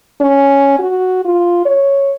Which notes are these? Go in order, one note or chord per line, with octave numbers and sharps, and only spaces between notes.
C#4
F#4
F4
C#5